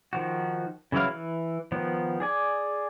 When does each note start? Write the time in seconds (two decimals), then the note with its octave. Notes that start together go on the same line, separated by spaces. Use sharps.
0.13 D#3 F3 F#4
0.92 C#3 E3 F#3 E4 F5
1.09 E3
1.72 D#3 F3 B3
2.20 G#4 D5 G#5